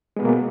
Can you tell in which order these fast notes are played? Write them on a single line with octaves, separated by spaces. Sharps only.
G#3 B3 B2 A#3